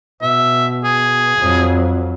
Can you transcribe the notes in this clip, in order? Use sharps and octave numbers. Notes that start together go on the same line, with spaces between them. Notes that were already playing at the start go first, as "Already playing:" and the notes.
B2 E5
G#4
F2 F#3